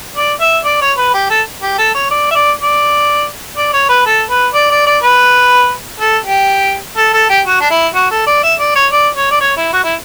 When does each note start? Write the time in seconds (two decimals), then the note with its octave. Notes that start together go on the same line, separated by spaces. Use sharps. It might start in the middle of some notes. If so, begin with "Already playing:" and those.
0.16 D5
0.41 E5
0.65 D5
0.81 C#5
0.97 B4
1.14 G4
1.30 A4
1.62 G4
1.78 A4
1.95 C#5
2.11 D5
2.31 E5
2.35 D5
2.60 D5
3.57 D5
3.73 C#5
3.89 B4
4.05 A4
4.30 B4
4.54 D5
4.70 D5
4.86 D5
5.03 B4
6.00 A4
6.24 G4
6.97 A4
7.13 A4
7.29 G4
7.46 F#4
7.60 D4
7.70 E4
7.95 F#4
8.11 A4
8.27 D5
8.43 E5
8.59 D5
8.75 C#5
8.92 D5
9.16 C#5
9.31 D5
9.41 C#5
9.57 E4
9.73 F#4
9.84 E4